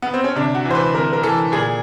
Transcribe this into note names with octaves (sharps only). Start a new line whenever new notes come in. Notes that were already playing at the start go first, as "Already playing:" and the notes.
B3
C4
C#4
C3 D4
F#4
E3
C5
B4
C3 A#4
A#4
E3 A4
A#2 G#4